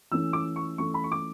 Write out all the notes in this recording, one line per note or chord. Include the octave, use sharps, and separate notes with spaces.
E3 A3 C#4 E6
D6
C#6
E3 A3 C#4 C#6
B5
C#6
D6